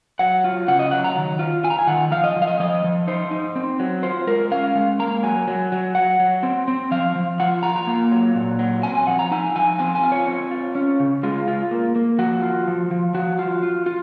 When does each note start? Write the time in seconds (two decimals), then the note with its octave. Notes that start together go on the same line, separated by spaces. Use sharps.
0.19 F#3 F#5
0.44 F4
0.68 C#3 F#5
0.79 D#5
0.91 F#3 F#5
1.04 A#5
1.16 D#3
1.39 F4
1.64 F4 G#5
1.70 A#5
1.79 G#5
1.87 D#3 F#5
2.11 F3 F5
2.24 D#5
2.36 F3
2.42 F5
2.47 D#5
2.60 F3 D#5
2.84 F3
3.07 D#4 C5
3.31 D#4
3.56 C4
3.79 F#3
4.03 F4 C5
4.27 G#3 A#4
4.51 C#4 F5
4.75 G#3
4.99 A#3 A#5
5.23 F#3 G#5
5.48 F#3
5.72 F#3
5.95 F#3 F#5
6.20 F#3
6.43 C4
6.68 C4
6.91 F3 F5
7.15 F3
7.40 F4 F#5
7.63 F4 A#5
7.76 A#5
7.87 A#3
8.12 F#3
8.35 A#2
8.59 F#3
8.83 C4 G#5
8.95 G#5
9.07 F3 F#5
9.19 A#5
9.31 D#4 G#5
9.56 F3 G#5
9.79 C4 G#5
9.95 G#5
10.03 F4
10.12 C#5
10.27 C4
10.51 F4
10.75 C#4
11.00 C#3
11.23 G#3 F4
11.48 F4
11.71 A#3
11.96 A#3
12.19 F3 F#4
12.42 F4
12.68 F3
12.91 F3
13.14 F3 F#4
13.39 F4
13.63 F4
13.86 F4